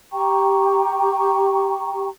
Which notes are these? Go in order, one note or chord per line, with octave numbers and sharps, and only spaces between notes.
G4 G5 A#5 C#6